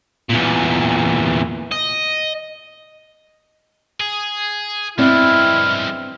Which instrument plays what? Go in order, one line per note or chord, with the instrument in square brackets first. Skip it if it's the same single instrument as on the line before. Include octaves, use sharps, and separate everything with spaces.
[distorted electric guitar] E2 A#2
D#5
G#4
[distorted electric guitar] G2 G#3 [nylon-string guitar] B3 C4 D5 [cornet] E4 [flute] F6